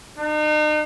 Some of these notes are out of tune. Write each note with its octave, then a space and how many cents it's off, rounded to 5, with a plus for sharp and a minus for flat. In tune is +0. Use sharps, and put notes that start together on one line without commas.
D#4 -40